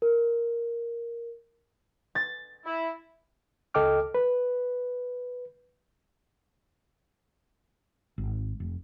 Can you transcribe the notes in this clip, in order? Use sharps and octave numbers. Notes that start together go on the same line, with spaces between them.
A#4
A6
E4
C#2 A4 D#5 G5 D6 F6
B4
G#1
F1